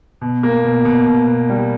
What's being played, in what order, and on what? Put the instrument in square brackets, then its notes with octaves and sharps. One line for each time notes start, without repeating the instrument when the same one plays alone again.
[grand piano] B2
A#3
B2
B2
B2
B2
G3